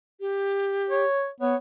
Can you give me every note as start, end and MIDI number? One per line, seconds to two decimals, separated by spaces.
0.20 1.05 67
0.90 1.29 73
1.41 1.55 59
1.41 1.56 73